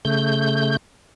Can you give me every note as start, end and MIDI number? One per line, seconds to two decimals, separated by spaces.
0.05 0.77 49
0.05 0.77 57
0.05 0.77 91